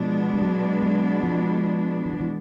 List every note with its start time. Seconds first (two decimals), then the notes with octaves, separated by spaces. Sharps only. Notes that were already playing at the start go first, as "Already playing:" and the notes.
Already playing: B2 F3 G#3 B3 D4
0.34 G3
0.42 F#3
0.83 F#3
1.23 F3
2.06 E3
2.13 F3
2.21 E3